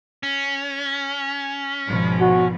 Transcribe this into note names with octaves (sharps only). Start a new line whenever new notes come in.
C#4
G#1 B2 F3
F#4